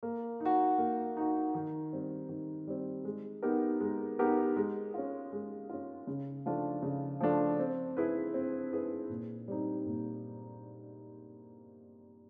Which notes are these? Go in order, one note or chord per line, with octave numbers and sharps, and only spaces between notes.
A#3
D#4
F#4
A#3
D#4 F#4
D#3
G3 C4
D#3
G3 C4
G#3
B3 D#4 G4 A#4
G#3
B3 D#4 G4 A#4
G#3
C#4 F4
G#3
C#4 F4
C#3
F3 A3 D4 F4
C#3
F3 A3 D4 F4
C4
E4 G#4 B4
C4
E4 G#4 B4
A#2
G3 C4 D#4
A#2